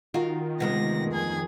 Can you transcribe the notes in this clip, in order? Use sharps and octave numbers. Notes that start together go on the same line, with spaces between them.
D#3 F4 F#4 A#4
D2 C3 G#3 B3 A#6
F2 G#4 G#6